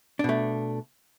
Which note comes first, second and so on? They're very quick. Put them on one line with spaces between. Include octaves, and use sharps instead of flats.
D4 B2 A3